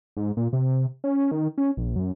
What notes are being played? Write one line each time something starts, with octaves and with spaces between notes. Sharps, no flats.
G#2
A#2
C3
C#4
D#3
C#4
A#1
F#2